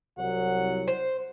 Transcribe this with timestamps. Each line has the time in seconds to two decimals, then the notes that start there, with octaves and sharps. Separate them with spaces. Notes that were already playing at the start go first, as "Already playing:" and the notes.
0.18 C2 F#3 F#5
0.88 C5